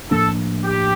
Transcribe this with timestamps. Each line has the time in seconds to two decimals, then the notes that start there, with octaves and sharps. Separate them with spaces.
0.10 A2 F3 A#3 D4 A4
0.64 G4